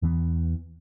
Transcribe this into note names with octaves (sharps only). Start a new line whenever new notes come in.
E2 E3 B3